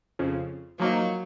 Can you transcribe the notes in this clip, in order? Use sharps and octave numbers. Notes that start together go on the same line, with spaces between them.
F2 C#3 F3
F3 F#3 A#3 D#4